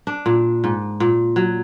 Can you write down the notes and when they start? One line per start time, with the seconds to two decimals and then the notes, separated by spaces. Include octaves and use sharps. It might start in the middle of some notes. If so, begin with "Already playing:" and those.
0.07 D4
0.26 A#2
0.64 G#2
1.00 A#2
1.36 F#3